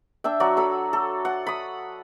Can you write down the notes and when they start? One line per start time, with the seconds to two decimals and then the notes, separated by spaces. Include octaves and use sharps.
0.24 D4 E5 G5
0.40 F#3 F#4 D5
0.57 F#3 A4 B5
0.93 A4
1.25 F#5
1.47 B5 D#6